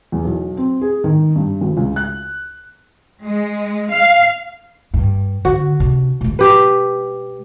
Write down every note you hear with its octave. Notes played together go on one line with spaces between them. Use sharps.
E2
B1
C4
G#4
D#3
G2
G#1
C#2
F#6
G#3
F5
G2
D3 F#4
C3 D4
B2 G#3
G4 B4